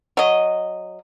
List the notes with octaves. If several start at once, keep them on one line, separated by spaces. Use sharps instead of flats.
F#3 D#5